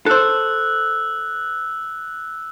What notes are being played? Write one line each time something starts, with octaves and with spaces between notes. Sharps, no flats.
A4 C5 E6 F#6